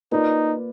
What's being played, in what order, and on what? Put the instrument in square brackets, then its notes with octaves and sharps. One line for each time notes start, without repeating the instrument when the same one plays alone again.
[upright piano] A#3 F4 B4 D5 [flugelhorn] D#4